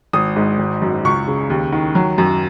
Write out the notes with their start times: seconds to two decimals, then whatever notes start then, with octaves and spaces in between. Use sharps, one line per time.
0.13 G#1 D#6
0.36 G#2
0.59 G#1
0.82 F#2
1.05 C#2 C#6
1.27 C#3
1.50 D#2
1.72 D#3
1.95 F#3
2.18 F#2